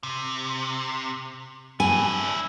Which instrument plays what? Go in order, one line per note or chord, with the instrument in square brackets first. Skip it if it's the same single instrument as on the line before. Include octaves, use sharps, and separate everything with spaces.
[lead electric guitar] C3
[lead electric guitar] D4 E4 [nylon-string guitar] G#5